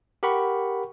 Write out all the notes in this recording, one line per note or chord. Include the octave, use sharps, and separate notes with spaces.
G4 A#4 F#5 B5 C#6